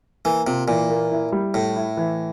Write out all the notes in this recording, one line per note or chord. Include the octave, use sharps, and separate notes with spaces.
E3 A#3
C3 F4
A#2 E3
A#3
E4
G3
A2 A3
E4
E3